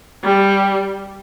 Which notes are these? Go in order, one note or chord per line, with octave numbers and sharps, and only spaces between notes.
G3